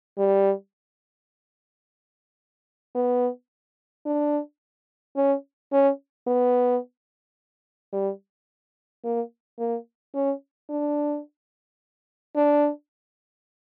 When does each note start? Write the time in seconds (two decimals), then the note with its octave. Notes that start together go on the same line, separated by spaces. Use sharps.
0.18 G3
2.95 B3
4.06 D4
5.16 C#4
5.72 C#4
6.27 B3
7.93 G3
9.04 A#3
9.59 A#3
10.15 C#4
10.70 D4
12.36 D4